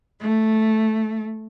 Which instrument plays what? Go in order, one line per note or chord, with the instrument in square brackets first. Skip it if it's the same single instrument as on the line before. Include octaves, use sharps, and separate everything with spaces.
[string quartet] A3